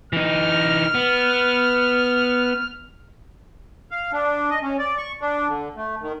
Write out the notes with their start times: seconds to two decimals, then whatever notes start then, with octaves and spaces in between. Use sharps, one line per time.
0.13 E3 D#4 F6
0.95 B3
3.91 F5
4.13 D4
4.50 D#5
4.62 C#4
4.79 D5
4.98 C#6
5.21 D4
5.49 D3
5.76 A3
6.02 D#3